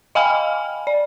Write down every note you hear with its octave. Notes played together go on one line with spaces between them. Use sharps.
D#5 F5 G5 G#5 B5 F6
D5